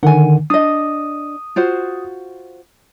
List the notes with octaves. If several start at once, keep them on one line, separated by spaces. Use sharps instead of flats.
D3 D#3 F#5 G#5
D4 D#5 D#6
F4 F#4 C5